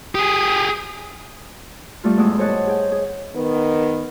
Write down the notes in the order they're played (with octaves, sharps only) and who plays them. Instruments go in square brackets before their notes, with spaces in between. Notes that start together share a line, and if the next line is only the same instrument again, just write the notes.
[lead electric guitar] G4 G#4 [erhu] D#6
[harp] G3 A3 F4
E2 A2 E3 G#3 D#6 E6
A4 C5 C#5 D#5 F#5 A5
G#4 G5
G#4
[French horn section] D#3 B3